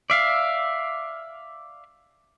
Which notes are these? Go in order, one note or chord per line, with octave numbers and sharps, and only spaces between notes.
D5 E5 F5